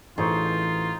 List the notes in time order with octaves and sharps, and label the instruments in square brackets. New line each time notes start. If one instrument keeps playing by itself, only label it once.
[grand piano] A1 A4 C#6 [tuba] E3 [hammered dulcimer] D#4 G#4 C5 [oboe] F4